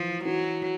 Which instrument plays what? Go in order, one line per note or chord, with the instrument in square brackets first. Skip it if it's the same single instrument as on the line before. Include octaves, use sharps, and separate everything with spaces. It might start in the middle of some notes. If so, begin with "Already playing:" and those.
Already playing: [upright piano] E3 [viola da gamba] F3
[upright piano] E3 [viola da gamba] F#3